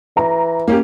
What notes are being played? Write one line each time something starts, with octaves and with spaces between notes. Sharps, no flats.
E3 A#5
A#3 C#4 G4